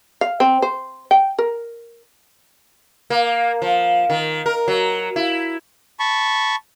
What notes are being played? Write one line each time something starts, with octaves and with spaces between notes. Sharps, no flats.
F5
C4
C5
G5
A#4
A#3
F3
D#3
A#4
F#3
E4
A5 B5 C#6